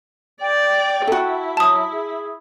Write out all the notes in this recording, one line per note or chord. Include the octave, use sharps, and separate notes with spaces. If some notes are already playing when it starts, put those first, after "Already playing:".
D5 G5
E4 F#4 A4
F#3 A5 D#6
G#4